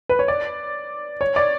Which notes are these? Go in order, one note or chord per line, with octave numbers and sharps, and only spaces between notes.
B4
C#5
D5
C#5
D5